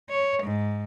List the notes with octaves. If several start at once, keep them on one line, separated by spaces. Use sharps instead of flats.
C#5
G#2